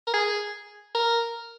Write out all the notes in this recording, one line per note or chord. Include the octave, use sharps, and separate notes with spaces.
A#4
G#4
A#4